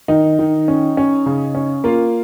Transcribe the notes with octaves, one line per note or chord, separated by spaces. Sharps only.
D#3 D#4
D#3
C#4
C#4
C#3
C#4
A#3 F4